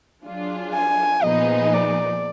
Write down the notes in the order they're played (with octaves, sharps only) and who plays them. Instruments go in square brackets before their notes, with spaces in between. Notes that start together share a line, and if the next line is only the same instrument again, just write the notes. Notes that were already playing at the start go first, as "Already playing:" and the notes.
[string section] F#3 D4 F4 G#4
[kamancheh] G#5
[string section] A#2 F3 B3 D#4 G#4 [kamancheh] D#5
[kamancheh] D5